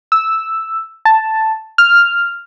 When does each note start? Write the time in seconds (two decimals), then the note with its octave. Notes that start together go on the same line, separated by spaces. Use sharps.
0.12 E6
1.05 A5
1.78 F6